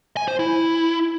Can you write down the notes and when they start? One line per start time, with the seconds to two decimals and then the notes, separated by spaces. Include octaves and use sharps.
0.17 G#5
0.28 C5
0.39 E4